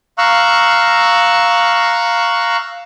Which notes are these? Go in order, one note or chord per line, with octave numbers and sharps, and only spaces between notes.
F5 A#5 C#6 E6 F#6